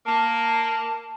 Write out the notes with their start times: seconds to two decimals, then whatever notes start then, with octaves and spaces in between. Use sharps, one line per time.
0.06 A#3 A5